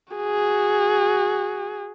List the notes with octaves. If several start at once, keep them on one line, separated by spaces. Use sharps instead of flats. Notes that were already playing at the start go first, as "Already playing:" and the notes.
F#4 G#4